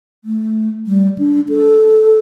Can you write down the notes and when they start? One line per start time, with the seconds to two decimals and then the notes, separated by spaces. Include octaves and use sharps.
0.24 A3
0.87 G3
1.18 D4
1.49 A4